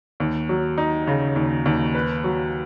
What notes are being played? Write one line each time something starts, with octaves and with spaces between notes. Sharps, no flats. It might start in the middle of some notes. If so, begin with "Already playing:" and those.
D#2
F#3
D#4
C#3
D#2
D#2
B4
F#3